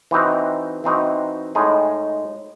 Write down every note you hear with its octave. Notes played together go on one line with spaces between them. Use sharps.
E3 C4 D#4 F#4
E3 C4 D#4 F#4
A2 G#3 D#4 G#4